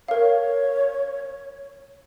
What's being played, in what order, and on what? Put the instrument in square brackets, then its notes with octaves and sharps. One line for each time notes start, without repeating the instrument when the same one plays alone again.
[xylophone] A#4 F5 [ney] C#5